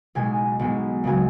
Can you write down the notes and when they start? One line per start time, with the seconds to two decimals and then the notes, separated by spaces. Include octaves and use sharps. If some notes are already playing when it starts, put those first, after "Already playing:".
0.15 B1 B2 G#3 G#5
0.59 B1 B2 G#3
1.04 C#2 C#3 F#3 G#5